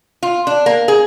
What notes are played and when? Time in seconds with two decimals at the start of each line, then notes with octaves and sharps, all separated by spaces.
0.23 F4
0.47 D4
0.66 A#3
0.88 G#4